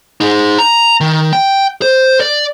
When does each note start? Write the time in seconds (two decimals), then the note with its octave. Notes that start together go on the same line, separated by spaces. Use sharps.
0.20 D#4 G#4
0.58 A#5
1.01 D#3
1.33 G5
1.82 C5
2.20 D5